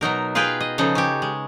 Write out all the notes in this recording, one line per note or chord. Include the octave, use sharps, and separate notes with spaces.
B2 F#3 D#4 A#4
F4 G#4 B4 F5 G5
D#5
C#3 F3 D#4 A4
C#4 G4
G#3